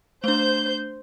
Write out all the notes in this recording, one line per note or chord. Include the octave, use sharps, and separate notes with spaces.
A3 D4 C5 G6